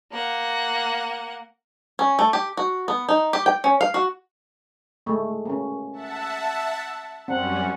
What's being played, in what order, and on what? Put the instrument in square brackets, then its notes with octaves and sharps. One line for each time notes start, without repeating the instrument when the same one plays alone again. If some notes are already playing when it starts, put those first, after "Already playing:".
[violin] A#3 F#5
[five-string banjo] C#4
A3
G4
F#4
B3
D#4
G4
G5
C#4
F5
F#4
[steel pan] G#3 A3
A#3 C#4
[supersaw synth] E5 F#5 A5
[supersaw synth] F#2 G3 C#4 [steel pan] C4 [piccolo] F#5